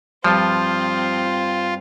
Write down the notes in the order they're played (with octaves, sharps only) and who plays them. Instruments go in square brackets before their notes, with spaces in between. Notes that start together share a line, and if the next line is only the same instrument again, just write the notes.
[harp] G2 [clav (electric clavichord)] F3 [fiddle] C4 [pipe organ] F4